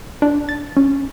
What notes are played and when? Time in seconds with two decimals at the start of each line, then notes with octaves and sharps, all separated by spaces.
0.22 D4
0.49 A6
0.77 C#4